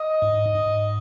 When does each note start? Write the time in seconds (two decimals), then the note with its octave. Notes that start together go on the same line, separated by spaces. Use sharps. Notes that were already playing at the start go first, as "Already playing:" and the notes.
Already playing: D#5
0.22 G#2
0.55 G#2